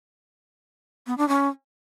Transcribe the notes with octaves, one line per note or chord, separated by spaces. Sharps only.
B3
D4
C#4